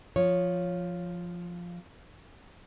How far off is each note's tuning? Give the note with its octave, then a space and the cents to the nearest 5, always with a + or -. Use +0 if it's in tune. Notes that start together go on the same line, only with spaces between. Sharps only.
F3 +0 C#5 -5